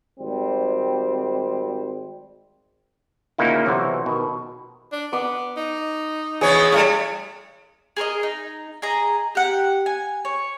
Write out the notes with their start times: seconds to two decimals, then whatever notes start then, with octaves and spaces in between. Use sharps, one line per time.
0.20 G#1 G3 C4
3.38 D2 A#2 C#3 A#3 D#4 E4
3.66 B1 C3 E3 F#4 C5
4.06 B2 D#3
4.92 D4
5.13 B3 D6
5.57 D#4
6.41 B2 E3 G#4 C#5
6.72 A2 C#3 G3
7.96 G#4 A#4 C5 D#5
8.23 D#4
8.82 G#4 D#5 A#5
9.35 G4 F#5
9.86 G#5
10.25 C#5